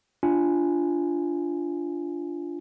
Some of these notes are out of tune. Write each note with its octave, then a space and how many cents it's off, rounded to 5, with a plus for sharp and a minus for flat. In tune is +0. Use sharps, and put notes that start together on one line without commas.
D4 -10 F4 -15 G#5 +0